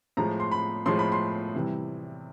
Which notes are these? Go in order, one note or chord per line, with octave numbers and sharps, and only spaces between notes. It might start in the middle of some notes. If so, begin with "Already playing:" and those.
A2 F3 G#3 A#5
C6
B5
A2 F3 G#3 C6
B5
C6
C3 E3 G3